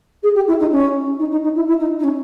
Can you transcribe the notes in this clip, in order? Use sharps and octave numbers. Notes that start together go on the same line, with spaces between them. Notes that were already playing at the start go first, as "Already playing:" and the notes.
G#4
G4
E4
D#4
C#4
D#4
D#4
D#4
E4
E4
D#4
D#4
C#4